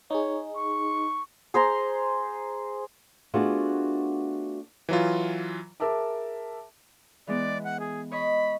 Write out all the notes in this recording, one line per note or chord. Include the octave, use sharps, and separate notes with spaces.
D#4 G#4 C#5
C#6
G#4 C5 A#5 C6
A3 B3 D4 F4 F#4 G#4
E3 F#3 F4
G#4 A#4 E5 A5 D6
E3 G#3 B3 D5
F#5
G#4
C#5 D#5 B5 C#6